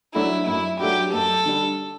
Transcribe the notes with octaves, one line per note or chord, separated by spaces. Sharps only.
F#3 A3 D4 E4 F#4
F#2 E4
F#3 A3 D4 F#4 G4
F#2 A4
D3 G3